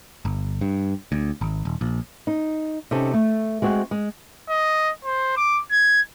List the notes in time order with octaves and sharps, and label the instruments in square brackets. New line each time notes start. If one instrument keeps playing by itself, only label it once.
[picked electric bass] G1
G2
D2
G#1
D#1
A#1
[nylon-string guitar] D#4
C3 C4 C#4 D#4 A4
A3
G#3 C4 F#4
G#3
[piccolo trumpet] D#5
C5
D6
G#6